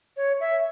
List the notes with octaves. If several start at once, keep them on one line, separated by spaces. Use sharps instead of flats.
C#5
E5